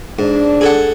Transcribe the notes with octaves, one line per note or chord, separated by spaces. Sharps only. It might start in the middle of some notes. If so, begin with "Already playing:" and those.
G#2 D4
G#4 A4 F#5